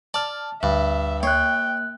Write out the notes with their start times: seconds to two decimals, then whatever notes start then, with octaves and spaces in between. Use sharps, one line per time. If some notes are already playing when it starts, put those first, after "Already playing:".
0.14 D5 A5 F6
0.63 D2 G2 E5
1.23 A#3 C#5 G5 F#6